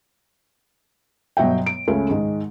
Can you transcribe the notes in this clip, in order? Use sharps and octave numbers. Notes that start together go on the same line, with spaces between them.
G1 B2 F#3 E5 G5
D7
C#2 C#3 A3 C#4
G#2 D#3 G#3